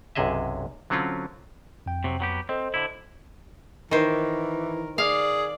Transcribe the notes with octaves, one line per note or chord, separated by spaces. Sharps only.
B1 F#2 C3 G#4 D#5 E5
D3 F#3 C4 C#4 F4
F2 G5
C3 F#3
F#3 B3 G4
C4 A4 C5 D#5
D3 E4
D#3 E3 A#4 C5
G#4 D5 F5